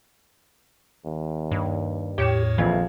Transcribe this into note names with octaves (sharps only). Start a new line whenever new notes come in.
D#2
G2
E2 A2 G4 C#5 C#7 E7
A#1 F2 E3 F5 G#6